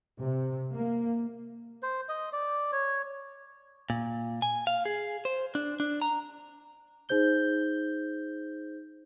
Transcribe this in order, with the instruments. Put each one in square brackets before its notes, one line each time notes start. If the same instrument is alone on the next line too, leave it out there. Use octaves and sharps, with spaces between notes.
[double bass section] C3
A#3
[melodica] C5
D#5
D5
C#5
[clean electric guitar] A#2
G#5
F5
G#4
C5
D4
D4
A#5
[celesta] D#4 G#4 C5 G6 G7